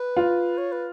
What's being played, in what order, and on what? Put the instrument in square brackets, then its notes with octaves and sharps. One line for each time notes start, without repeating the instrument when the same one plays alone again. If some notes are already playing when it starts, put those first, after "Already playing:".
Already playing: [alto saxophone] B4
[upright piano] F4
[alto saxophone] C#5
B4